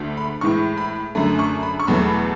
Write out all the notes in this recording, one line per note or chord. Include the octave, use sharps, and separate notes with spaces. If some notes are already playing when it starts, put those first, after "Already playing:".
Already playing: D2 D3 A3
B5
A2 E3 G#3 C#6
B5
F#2 D3 A3 B5
C#6
B5
C#6
E2 B2 F#3 A3 B5